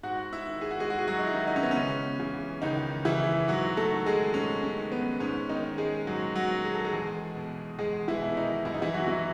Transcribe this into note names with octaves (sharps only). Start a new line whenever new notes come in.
G#2 F#4 F#5
E4 E5
D#3
G#4
F#4
G#3 G#4
G#2 F#4
G#4
F#3 F#4
D#4
E4
D#3 D#4
D#4
C#4
B3
C#2 C#4
C#3 E3
C#2 D#3 D#4
C#3 E3 E4
G#2 F#3 F#4
A3 A4
D#3
G#3 G#4
G#2 C#4
C#4
D#3
B3
G#2 C#4
D#3 D#4
D#3
G#3 G#4
G#2 F#3 F#4
F#3 F#4
D#3
G#4
A4
G#3 G#4
E2
B2
E2 G#3 G#4
E3 E4
B2
D#3 D#4
F#2 E4
D#4
E3 E4
F#3 F#4
E3